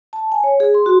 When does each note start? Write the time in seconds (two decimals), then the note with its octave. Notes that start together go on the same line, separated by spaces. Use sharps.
0.13 A5
0.32 G#5
0.44 C#5
0.60 G#4
0.74 C6
0.86 F#4